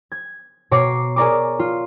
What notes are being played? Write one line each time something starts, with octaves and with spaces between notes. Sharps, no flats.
G#6
B2 C#5 A#5 D6 C7
G#4 A#4 D5 A#5 C#6 D6
F4